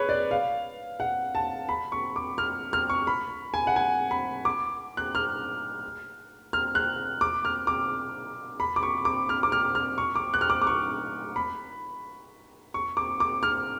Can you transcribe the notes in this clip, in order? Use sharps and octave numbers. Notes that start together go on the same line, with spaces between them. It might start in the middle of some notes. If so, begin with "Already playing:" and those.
Already playing: G#4 B4 C#5
D5
F5
F#5
A5
B5
C#6
D6
F6
F6
C#6
B5
G#5
F#5
G#5
B5
D6
F#6
F6
F6
F#6
D6
F6
D6
B5
D6
C#6
D6
F6
D6
F6
F6
C#6
D6
F#6
F6
D6
D6
C#6
B5
C#6
D6
D6
F6